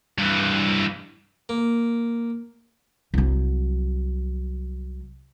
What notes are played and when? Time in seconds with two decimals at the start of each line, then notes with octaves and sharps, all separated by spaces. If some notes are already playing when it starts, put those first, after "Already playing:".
0.18 G2 E3
1.49 A#3
3.14 C2 F#3